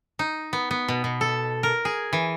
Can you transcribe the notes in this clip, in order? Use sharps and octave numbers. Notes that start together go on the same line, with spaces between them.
D#4
B3
B3
B2
B2
A4
A#4
G#4
E3